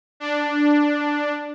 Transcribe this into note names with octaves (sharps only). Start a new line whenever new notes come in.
D4